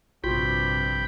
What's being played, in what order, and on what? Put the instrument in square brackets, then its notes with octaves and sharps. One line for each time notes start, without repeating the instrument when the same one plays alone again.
[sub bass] A#1 [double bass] G2 C3 [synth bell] F4 F#4 [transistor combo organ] G5 B5